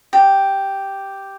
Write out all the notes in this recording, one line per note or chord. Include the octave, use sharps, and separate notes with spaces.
G4